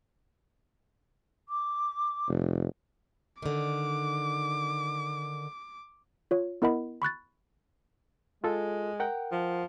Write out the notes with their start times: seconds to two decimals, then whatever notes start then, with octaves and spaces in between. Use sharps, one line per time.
1.48 D6
2.28 F1
3.42 D3 D#3 D6
6.31 F4 C#5
6.62 B3 E4 A#4 D#5 F#5 B5
7.02 B5 C#6 F#6 A6
8.44 G#3 F4 A4
9.00 A#4 F#5 G5
9.32 F3